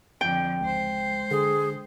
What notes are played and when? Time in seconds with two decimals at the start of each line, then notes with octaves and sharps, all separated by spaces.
0.21 F2 D3 G5
0.61 C#2 G#3 C5
1.31 D3 G#4